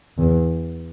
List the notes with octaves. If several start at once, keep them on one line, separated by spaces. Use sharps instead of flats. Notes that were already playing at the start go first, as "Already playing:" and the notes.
E2